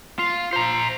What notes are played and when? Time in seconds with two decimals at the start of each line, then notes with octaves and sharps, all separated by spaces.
0.19 F4
0.53 C5 A#5